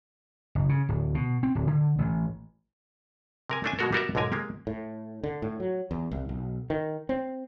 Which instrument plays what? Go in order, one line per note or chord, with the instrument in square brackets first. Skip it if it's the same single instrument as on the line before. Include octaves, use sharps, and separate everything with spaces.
[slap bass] F#1
C#3
D1
B2
C4
D1
D3
A1
[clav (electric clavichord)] C3 A#4 G#5
A3 C#4 D4 E5 G#5
B2 G#3 A3 F#4 A4 A#4
G3 B3 F#4 A#4 D5 E5
B1 G#2 D3 A#4 G#5
G#3 A#3 G4
[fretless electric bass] A2
D3
A2
F#3
E2
C2
B1
D#3
C4